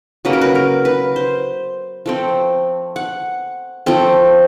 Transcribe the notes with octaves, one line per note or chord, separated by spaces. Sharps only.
C#3 F#3 A#3 B4
A#4
B4
A#4
B4
C5
F3 A3 C4
F#5
F3 A3 C4